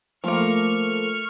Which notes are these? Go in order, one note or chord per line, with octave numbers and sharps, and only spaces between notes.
F3 A3 A#3 C#6 F6